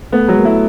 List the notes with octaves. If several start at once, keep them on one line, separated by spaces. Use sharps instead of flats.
A3 B3
F#3 G#3
A#3
A3 E4